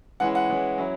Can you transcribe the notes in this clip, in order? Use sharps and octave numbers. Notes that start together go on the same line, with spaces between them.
E3 G#3 C#4 E4 F#5
F#5
E3 G#3 C#4 E4
F#3 C#4 E4